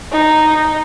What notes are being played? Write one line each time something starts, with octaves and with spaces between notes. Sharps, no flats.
D#4